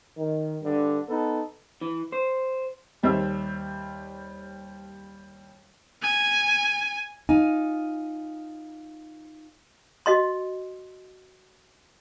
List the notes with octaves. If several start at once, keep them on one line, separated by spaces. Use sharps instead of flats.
D#3
G2 D3
B3 D#4 A4
E3
C5
D#2 G3 C5 E5 E6
G#5
D#4 F4 G#5
F#4 D#5 C6